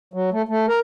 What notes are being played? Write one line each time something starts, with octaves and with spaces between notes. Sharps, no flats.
F#3
A3
A3
A#4